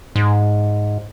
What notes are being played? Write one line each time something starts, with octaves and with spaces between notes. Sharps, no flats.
G#2